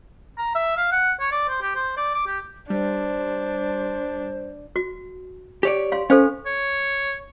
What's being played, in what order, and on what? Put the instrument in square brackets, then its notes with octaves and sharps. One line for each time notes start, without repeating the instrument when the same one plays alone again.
[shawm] A#5
E5
F5
F#5
C#5
D5
C5
G4
C5
D5
D6
G4
[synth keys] G3 [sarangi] D4 [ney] C5
[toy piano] F#4
[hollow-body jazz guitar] G4 C#5 D5
[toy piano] F5 C6
[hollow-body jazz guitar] C#4 [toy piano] A4 C5 F5
[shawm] C#5